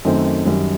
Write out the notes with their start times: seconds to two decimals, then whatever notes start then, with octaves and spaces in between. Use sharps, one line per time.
0.05 F#2 D#3 A3 C4
0.46 F#2 D#3 G3